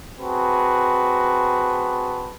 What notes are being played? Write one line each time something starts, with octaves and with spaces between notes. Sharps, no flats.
C4 F#4 G#4 B4 A5